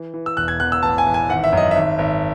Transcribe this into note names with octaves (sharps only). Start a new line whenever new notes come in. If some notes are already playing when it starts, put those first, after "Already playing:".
Already playing: E3
E3
E6
E1 F#6
G#6
E2 F#6
E6
A1 A5
G#5
A1
G#5
G#1 F#5
E5
F#2 D#5
G#1 E5
G#1